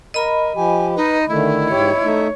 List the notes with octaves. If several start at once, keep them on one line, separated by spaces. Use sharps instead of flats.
A#4 D#5 B5
F3 G4 G#5
D#4 B4
D3 D#3 A3 E4
G#2 G4 C#5
A3 D#4 E5